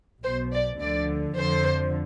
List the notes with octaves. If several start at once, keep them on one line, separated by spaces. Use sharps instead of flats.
B1 B2 C5
D5
D2 D3 F3 D5
F2 D3 F3 C5